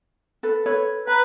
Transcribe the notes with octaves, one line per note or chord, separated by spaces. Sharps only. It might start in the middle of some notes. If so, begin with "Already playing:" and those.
A4 B4
A4 B4 C#5
B4 A#5